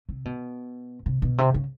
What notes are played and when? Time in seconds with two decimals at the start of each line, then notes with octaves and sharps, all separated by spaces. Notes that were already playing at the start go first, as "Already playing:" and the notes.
0.09 C3
0.25 B2
1.06 C3
1.22 B2
1.38 C3
1.54 C#3